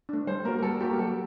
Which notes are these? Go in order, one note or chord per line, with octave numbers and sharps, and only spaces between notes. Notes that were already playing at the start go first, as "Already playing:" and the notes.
A3 D4
G3 C5
A#3 F#4 A#4
A#4
G3 A4
A#3 F#4 G4
A#4
F#3 A4